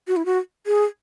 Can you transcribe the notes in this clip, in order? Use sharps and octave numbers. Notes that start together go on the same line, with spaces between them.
F#4
E4
F#4
G#4